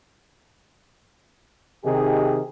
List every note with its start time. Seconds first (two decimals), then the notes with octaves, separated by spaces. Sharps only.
1.84 C3 D#3 D#4 G4 G#4